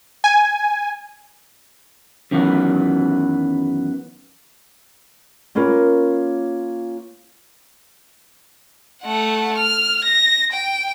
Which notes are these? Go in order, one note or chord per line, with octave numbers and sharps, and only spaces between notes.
G#5
F#2 D#3 E3 F#3 B3
A#3 C#4 F4 A#4 B4
A3 F#5
F6
A#6
G5